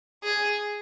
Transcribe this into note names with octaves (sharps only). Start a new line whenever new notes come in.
G#4